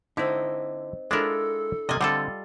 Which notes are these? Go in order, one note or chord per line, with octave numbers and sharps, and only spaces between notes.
D3 C4 D#4 E4
G#3 D4 E4 F4 A4 A#4
C3 A#3 D5 D#5 G#5
D3 G3 C4 F4 A4 F#5